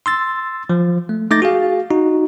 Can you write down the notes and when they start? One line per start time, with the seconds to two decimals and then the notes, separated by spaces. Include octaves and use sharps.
0.06 C6 E6 A6
0.70 F3
1.09 A3
1.31 A3 D#4 D6 G6 A6 A#6
1.42 F#4 G#4 F5
1.91 D#4 F#4